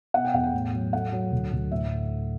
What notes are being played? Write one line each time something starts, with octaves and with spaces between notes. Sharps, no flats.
B2 F#5
G5
E2 F#5
G5
A2
F#3
A3 F#5
F#3
D2
D2
A2 E5